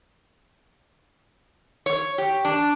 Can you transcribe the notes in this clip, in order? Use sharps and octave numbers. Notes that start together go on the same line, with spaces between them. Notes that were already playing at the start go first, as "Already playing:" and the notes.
C#5
G4
D4